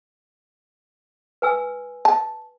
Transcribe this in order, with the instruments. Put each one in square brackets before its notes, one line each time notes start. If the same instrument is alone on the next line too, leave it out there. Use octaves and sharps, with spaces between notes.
[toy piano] B4 G#5 E6
[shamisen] A5